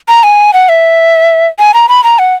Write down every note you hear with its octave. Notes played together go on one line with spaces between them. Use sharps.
A#5
G#5
F#5
E5
G#5
A#5
B5
A#5
F#5